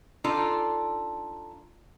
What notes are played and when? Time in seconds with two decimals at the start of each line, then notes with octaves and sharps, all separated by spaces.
0.24 D4 D#4 F4 A4